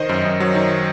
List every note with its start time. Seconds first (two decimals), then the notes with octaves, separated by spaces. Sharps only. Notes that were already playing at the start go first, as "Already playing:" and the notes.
Already playing: D#3 C5 D#5
0.09 F#2
0.25 F#2
0.40 F#3
0.55 D#3